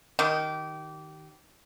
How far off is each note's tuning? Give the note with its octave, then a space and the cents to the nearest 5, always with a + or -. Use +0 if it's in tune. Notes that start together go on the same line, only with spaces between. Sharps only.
D#3 +0 G4 -25